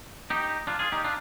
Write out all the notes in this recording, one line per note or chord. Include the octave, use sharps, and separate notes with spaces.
D#4 G4
D4 F4
F4 G#4
D#4 G4
D4 F4